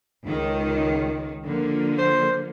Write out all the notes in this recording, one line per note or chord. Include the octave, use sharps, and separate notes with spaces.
C#2 D#3
D3 F3 A#3
C5